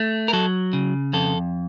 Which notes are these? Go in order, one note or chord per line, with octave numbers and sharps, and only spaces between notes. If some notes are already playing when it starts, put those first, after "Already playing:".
Already playing: A3
A#4
F#3 A4
C#3
F2 A4